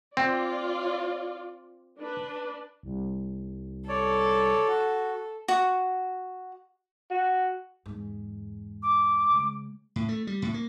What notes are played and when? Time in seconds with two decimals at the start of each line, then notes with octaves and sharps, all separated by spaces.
0.17 C4 F4 D5
2.00 D4 B4
2.83 C2
3.88 A4 C#5 D5
4.67 F#4
5.48 F#4
7.10 F#4
7.86 E2 G#2
8.83 D6
9.30 C#3 G#3
9.96 A2
10.09 A3
10.27 G3
10.42 A2
10.54 A#3